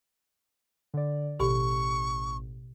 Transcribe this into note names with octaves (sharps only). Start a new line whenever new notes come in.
D3 D5
A1 B2 G4 C#6